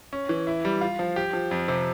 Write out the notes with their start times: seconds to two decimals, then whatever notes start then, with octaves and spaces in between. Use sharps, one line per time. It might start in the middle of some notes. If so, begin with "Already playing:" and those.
0.13 C#4
0.29 E3
0.47 E4
0.65 G3
0.81 F4
0.99 F3
1.16 G4
1.33 F3
1.51 F2
1.68 C3